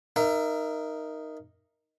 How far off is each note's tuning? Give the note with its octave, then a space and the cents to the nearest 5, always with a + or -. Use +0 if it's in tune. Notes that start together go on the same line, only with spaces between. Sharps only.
D#4 +0 A#4 +0 E5 +30